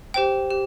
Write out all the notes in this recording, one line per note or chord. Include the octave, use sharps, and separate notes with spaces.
G4 C5 G5
G4